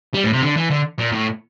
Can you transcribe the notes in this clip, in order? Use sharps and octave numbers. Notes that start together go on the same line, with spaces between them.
G3
A2
C3
D3
E3
D3
A#2
A2